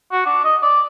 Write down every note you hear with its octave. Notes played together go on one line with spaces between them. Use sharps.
F#4
D4
D#5
D5